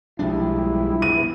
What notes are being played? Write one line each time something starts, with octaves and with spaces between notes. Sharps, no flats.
B1 F3 G3 G#3 D4 E4
B3 G#4 D#7